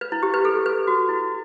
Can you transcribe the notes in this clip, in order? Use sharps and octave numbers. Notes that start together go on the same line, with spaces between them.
B4
E4
G4
B4
A4
B4
F#4
E4